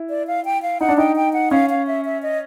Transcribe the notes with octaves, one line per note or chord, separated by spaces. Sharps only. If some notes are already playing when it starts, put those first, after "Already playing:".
Already playing: E4
D5
F5
G5
F5
D#4 F#5
D4
D#4 G5
G5
F#5
C#4 F5
F5
E5
E5
D#5